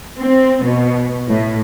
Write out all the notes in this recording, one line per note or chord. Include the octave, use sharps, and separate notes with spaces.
C4
B2
A2